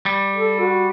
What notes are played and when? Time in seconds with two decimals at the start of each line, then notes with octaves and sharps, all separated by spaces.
0.06 G3
0.36 A4
0.59 F#4